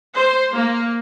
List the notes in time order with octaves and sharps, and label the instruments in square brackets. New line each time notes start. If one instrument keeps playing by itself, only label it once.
[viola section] C5
A#3